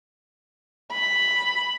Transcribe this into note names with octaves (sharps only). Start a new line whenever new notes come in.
B5